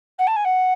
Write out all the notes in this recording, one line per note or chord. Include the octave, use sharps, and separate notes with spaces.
F#5
A5
G#5
F#5